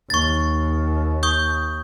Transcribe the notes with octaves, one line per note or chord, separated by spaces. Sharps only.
D#2 C#6 A6
C#6 D#6 G6